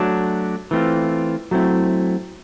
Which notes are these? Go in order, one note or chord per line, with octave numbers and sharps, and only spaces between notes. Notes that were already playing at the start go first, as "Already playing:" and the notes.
Already playing: F#3 A3 D4
E3 A3 C4 F4
F#3 A3 C4 E4